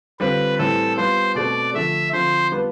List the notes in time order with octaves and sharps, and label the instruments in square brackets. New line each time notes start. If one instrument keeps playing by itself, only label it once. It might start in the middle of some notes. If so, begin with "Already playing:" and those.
[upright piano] D3 G3 C4 F4 C5 [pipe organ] B4
[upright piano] A2 E3 G3 C4 E4 [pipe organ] A4
[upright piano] G3 B3 F4 [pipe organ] C5
[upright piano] B2 A3 C4 [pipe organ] D5
[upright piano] D3 F3 A3 [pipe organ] E5
[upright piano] D3 F3 C4 F4 [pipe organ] C5
[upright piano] G3 B3 D4 F4 B4